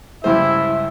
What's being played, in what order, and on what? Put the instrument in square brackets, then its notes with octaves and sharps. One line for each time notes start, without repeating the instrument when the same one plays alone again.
[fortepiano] C#2 G2 C5 [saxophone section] E4 [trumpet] E5